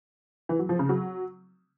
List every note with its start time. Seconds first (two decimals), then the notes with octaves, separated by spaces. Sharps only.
0.49 E3
0.59 F#3
0.69 F3
0.79 C#3
0.89 F#3